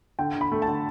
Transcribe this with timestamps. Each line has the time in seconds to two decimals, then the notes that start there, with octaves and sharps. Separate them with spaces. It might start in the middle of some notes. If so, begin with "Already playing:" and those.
0.19 D3 G5
0.35 D3
0.41 B5
0.52 A3
0.62 A5
0.67 D3